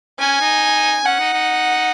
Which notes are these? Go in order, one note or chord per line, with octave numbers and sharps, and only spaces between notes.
C#4 G#5
D#4
C#4 F#5
D#4
D#4